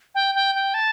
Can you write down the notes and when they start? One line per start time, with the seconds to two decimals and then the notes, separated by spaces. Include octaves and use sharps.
0.15 G5
0.35 G5
0.55 G5
0.74 A5